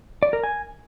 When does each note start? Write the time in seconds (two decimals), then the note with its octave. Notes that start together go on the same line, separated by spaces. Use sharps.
0.23 D5
0.33 A#4
0.44 G#5